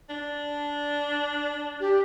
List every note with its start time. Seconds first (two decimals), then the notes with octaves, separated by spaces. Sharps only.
0.09 D4
1.80 G4